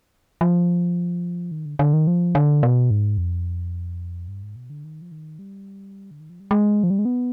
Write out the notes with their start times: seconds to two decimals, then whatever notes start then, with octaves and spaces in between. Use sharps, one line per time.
0.41 F3
1.51 D#3
1.66 D3
1.79 D3
1.93 D#3
2.07 F3
2.35 D3
2.63 B2
2.90 G#2
3.18 F2
4.28 G2
4.43 G#2
4.56 B2
4.70 D3
4.84 D#3
5.02 F3
5.12 D#3
5.39 G3
6.11 D3
6.20 D#3
6.30 F3
6.40 G3
6.51 G#3
6.84 F3
6.90 G3
6.99 G#3
7.05 B3